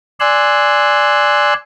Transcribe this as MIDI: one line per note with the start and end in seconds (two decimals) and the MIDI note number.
0.20 1.54 74
0.20 1.54 80
0.20 1.54 84
0.20 1.54 88
0.20 1.54 90